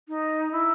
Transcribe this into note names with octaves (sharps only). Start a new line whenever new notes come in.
D#4
E4